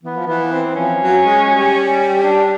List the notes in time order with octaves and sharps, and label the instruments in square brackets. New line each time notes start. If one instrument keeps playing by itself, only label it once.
[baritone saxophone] E3 [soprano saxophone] B3
[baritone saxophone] F3
[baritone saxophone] E3 [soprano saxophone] B3
[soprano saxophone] C4
[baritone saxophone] F3 [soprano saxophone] C#4
[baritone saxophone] F#3
G#3
G3
[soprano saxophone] D4